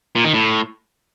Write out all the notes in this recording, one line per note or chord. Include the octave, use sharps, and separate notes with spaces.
A#2
D#3
A2